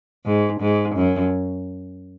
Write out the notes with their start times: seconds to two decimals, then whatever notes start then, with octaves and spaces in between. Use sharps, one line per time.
0.25 G#2
0.61 G#2
0.95 F#2